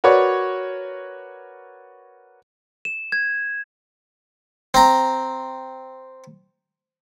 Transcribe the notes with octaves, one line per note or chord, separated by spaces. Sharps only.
F#4 A#4 B4 C#5 D5 C#6
E7
G#6
C4 A#5